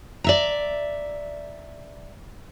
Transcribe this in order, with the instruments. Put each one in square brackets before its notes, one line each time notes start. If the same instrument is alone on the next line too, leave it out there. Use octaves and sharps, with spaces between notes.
[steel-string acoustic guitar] D5 E5 A#5